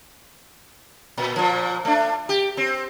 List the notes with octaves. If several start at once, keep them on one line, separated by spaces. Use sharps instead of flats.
A#2
A#2 F3
A3 D4
G4
C4